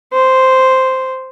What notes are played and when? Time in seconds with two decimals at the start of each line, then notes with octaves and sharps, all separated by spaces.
0.13 C5